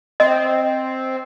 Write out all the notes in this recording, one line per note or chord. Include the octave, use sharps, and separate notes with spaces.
C4 D#5